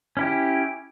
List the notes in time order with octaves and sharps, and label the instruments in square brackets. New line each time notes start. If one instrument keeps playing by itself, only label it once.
[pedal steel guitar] C#4 E4 G4